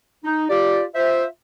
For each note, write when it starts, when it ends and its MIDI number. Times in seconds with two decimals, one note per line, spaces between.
0.24 0.45 63
0.50 0.83 65
0.50 0.83 67
0.50 0.83 74
0.95 1.24 65
0.95 1.24 72
0.95 1.24 76